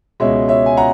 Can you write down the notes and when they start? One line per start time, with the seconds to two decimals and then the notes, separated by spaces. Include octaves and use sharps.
0.20 C#2 B2 G#3 C#5 E5
0.48 C#5 E5
0.66 G#5
0.77 F#5 A#5